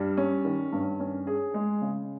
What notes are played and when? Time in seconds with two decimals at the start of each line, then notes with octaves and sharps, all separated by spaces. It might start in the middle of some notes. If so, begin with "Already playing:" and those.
Already playing: G2 G3
0.17 C#4
0.45 D#3
0.72 G2
1.00 C#4
1.27 G#4
1.54 G#3
1.82 C#3